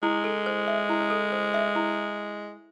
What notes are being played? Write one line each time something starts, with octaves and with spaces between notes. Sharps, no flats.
G#3 E4
A4
C5
E5
E4
A4
C5
E5
E4